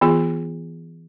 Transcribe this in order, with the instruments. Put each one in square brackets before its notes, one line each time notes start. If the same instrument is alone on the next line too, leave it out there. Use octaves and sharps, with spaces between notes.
[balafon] E3 B3 F4 G#4